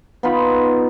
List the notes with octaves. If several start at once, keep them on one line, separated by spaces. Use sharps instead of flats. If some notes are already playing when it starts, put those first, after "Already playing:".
B3 D#4 F4 B5